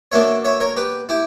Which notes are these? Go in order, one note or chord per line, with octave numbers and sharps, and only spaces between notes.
B2 A#3 D4 C#5 E5
C#5 E5
A#4 C#5
G4 B4
E4 G4